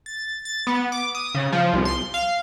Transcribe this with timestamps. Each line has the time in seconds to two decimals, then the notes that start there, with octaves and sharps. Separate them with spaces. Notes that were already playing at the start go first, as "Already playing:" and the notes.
0.06 A6
0.45 A6
0.67 B3
0.92 D6
1.15 D#6
1.35 C#3
1.52 F3
1.73 C2
1.85 C6
2.14 F5